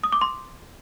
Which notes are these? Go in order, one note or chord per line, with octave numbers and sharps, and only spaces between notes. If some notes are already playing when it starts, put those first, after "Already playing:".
D#6
D6
C6